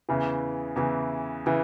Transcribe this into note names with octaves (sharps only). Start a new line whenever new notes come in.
E2 C#3 E3
E2 C#3 E3
C#3 E3